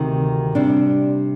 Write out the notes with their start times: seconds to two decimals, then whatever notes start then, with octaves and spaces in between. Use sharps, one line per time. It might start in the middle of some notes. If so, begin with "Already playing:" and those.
Already playing: D2 C3 D#3
0.55 C3 G3 D4